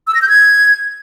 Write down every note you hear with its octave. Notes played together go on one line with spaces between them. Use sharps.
E6
A#6
G6
G#6